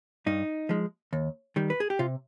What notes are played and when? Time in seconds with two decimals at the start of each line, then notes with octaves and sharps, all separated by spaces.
0.26 G2 D#4
0.69 F3 G#3
1.13 D#2
1.56 D#3 G3
1.70 B4
1.80 G#4
1.90 G4
1.99 C3 F4